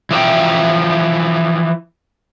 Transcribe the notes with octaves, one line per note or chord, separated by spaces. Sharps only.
E3 F3 E5 G5